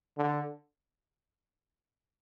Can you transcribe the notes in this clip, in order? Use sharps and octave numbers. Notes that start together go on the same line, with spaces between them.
D3